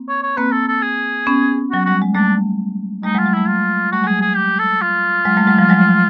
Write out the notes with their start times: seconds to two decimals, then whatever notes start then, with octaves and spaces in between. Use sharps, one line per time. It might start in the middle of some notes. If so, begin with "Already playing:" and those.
Already playing: A#3 C4
0.09 C#5
0.23 C#5
0.37 A#3 C4 B4
0.52 A4
0.68 A4
0.82 G#4
1.27 B3 C#4
1.71 F#3 F#4
1.85 G3 F#4
2.02 G#3
2.15 G3 A3 D4
3.04 G3 A3 D#4
3.15 F#3 G#3
3.18 F4
3.26 F#3 G#3
3.33 G3 A3 E4
3.48 F4
3.92 G3 A3 F#4
4.04 F#3 G#3 G#4
4.22 G#4
4.37 G4
4.59 A4
4.81 F4
5.25 F#3 G#3
5.37 G3 A3
5.47 F#3 G#3
5.58 F3 G3
5.69 F#3 G#3